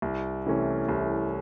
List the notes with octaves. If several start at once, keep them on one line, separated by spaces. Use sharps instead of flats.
C2
C3 E3 A3 C#4
C2